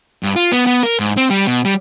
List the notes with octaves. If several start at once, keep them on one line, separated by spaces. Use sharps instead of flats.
G2
F4
B3
B3
A#4
G#2
C4
G3
B2
G3